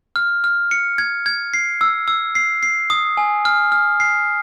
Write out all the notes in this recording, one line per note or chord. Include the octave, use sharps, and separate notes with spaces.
F6
F6
C#7
G#6
G#6
C7
E6
E6
C7
C7
D#6
G#5
F6
F6
C7